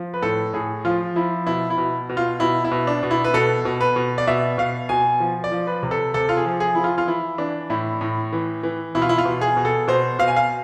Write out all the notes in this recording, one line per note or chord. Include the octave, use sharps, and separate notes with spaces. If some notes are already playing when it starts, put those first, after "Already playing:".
Already playing: F3
B4
A2 A4
A2 G#4
F3 F4
F3 E4
B2 E4
E4
B2
B2
F4
B2 E4
E4
B2
D4
B2
E4
B4
B2 A4
B2
B4
B2
D5
B2 E5
B2 F5
B2 G#5
F3
D5
F3
B4
C3
A4
C3 A4
F4
G#4
F3
G#4
F3 E4
F4
F4
E3 E4
E3 D4
A2 E4
A2
E3
E3
B2 E4
F4
E4
F4
B2
G#4
B2
A4
B2 C5
B2 F5
G#5
F5